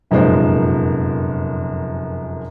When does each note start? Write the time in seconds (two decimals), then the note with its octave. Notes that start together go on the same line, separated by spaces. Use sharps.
0.11 F1 F#2 A#2 F3 G#3 C5